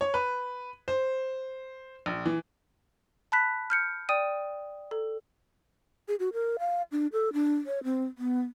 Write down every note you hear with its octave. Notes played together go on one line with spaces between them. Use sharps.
C#5
B4
C5
A#1
E3
A5 B5 F#6 B6
F6 G6 C#7
D5 G5 D#6 D#7
A4
G#4
F#4
A#4
F5
D4
A4
D4
C#5
C4
B3